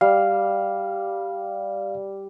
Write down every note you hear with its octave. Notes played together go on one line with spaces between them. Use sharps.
G3 F5